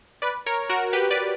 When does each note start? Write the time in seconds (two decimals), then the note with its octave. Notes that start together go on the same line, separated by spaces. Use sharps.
0.22 B4 D5
0.46 A#4 C#5
0.69 F#4 A#4
0.93 G4 B4
1.10 B4 D5